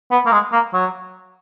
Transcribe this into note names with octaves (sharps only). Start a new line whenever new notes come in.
B3
A#3
G#3
A#3
F#3